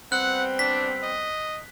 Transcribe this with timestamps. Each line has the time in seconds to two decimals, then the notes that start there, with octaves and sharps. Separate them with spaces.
0.12 G3 B3 C4 F#5 F#6
0.59 D4 B6
1.03 D#5